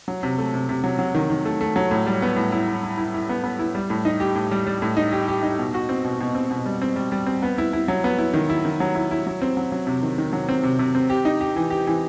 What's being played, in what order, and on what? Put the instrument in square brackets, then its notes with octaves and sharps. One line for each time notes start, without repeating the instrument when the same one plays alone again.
[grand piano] F#3
C3
A3
C3
C3
F#3
F#3
D#3
D#3
A3
A3
F#3
A2
G3
B3
A2
E4
E4
E4
E4
E4
B3
B3
E4
G3
A2
D#4
G4
A2
G3
G3
A2
D#4
G4
G4
D#4
B2
F#4
C4
B2
B2
C4
B2
G3
C4
G3
G3
C4
B3
E4
E4
F#3
B3
E4
D#3
E4
D#3
F#3
E4
E4
F#3
C4
F#3
F#3
C3
D#3
D#3
F#3
C4
C3
C3
C4
G4
D#4
G4
E3
G4
E3